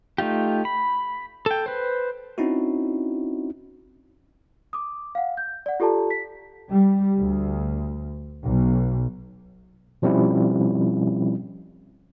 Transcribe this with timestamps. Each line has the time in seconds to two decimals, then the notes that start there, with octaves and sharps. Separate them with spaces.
0.18 A3 D#4 F4 G4
0.65 B5
1.46 A4 G5
1.66 B4 C5
2.38 C4 C#4 D#4 E4 F#4
4.73 D6 D#6
5.15 F5 F#5
5.37 G6
5.66 D5 F#5
5.80 F4 G4 A4 D5 A5 A#5
6.11 B6
6.71 G3
7.19 D2
8.43 B1
10.02 B2 F3 G3 C4 C#4 E4